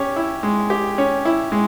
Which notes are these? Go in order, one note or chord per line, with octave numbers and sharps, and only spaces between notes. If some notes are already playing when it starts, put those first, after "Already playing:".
Already playing: C#4 G4
E4
G#3
G4
C#4
E4
G#3